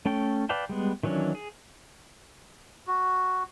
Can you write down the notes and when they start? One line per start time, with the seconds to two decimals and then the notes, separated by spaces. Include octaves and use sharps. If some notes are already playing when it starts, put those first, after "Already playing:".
0.06 A3 C#4 A4 G5
0.49 B4 D5 F5 G5 A5
0.69 G3 G#3 B3
1.03 D#3 E3 F#3 C#4 D4
1.35 G#4
2.87 F#4